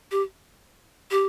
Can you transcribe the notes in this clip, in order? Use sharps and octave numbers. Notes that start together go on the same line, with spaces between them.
G4
G4